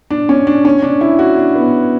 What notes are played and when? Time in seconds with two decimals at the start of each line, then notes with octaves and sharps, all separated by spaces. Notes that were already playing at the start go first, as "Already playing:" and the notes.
0.11 D4
0.29 C#4
0.47 D4
0.65 C#4
0.82 D4
1.01 E4
1.19 F#4
1.37 D4
1.55 B3